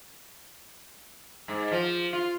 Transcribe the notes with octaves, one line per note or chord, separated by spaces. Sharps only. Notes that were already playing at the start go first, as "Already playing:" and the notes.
G#2
F3
F4